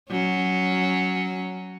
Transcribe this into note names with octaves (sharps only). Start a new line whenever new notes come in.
F#3 C#4